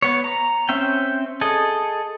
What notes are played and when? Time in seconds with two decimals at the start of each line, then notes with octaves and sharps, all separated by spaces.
0.02 B3 C#5
0.24 A#5
0.69 C4 C#4 E5 G5
1.41 G#4 A4 D#5